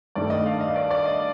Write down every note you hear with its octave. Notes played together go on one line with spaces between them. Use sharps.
G2 D#3 A3 D5
D#5
F5
D#5
D5
D5
D#5